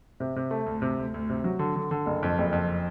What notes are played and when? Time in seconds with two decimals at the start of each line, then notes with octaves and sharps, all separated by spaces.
0.20 C3
0.36 C3
0.51 A3
0.66 D2
0.82 C3
0.98 D2
1.14 D2
1.29 C3
1.44 F#3
1.59 D3
1.76 D3
1.91 D3
2.06 F#1
2.23 F2
2.38 F#1
2.52 F2